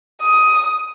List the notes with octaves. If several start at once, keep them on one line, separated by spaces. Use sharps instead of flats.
D#6